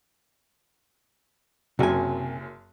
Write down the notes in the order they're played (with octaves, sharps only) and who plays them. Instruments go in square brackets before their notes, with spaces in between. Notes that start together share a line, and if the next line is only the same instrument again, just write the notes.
[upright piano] F#1 F#2 F#3 [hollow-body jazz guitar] C3 G#5